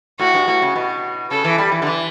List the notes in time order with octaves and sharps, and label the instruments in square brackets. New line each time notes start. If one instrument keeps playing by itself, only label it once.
[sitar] A2 [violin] F#4
[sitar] G2
A2
C#3
B2
[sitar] C#3 [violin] A4
[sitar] E3
G3
E3
D3
E3